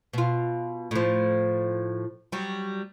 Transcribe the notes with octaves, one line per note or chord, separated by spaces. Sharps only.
B2 F4
A2 F3
F#3 G3